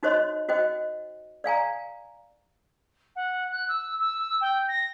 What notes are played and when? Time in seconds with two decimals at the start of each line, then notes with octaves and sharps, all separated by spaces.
0.03 D#4 F#4 C5 C#5 D#5 C6
0.49 F#4 C5 D#5 G5
1.44 D5 F5 G#5 A#5
3.15 F#5
3.51 F#6
3.68 E6
3.99 E6
4.41 G5
4.68 A#6